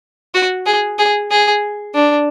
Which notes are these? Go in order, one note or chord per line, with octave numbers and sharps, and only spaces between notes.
F#4
G#4
G#4
G#4
D4